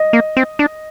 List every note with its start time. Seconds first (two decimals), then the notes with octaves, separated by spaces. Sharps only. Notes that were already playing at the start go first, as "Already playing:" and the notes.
Already playing: D#5
0.13 A#3
0.37 C4
0.59 D4